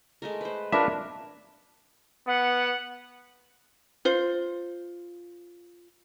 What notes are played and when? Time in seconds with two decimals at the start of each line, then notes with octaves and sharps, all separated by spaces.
0.22 G#3 A3 A#4
0.41 B4 C5
0.72 D4 F4 A#4 B4 C#5 E5
2.27 B3 F#5
4.05 F4 C5